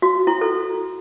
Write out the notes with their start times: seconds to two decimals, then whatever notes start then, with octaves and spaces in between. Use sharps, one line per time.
0.02 F#4
0.27 E4
0.41 A4